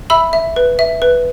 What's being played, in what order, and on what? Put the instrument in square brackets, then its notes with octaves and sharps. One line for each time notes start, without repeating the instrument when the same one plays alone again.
[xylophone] E5 B5 E6
E5
B4
E5
B4